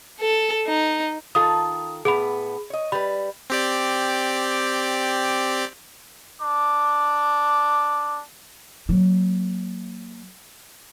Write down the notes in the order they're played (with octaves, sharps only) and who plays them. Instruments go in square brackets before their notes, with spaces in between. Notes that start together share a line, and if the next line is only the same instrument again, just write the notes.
[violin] A4
D#4
[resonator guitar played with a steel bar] D#3 F4 A4 [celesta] D#6
[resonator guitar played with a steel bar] A2 B3 [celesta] G#4 B5
[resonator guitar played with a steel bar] C#5 D#5
[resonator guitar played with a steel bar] G3 B4 [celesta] B5
[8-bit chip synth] C4 G4 D5
[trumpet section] D4 D6
[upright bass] F#3 A#3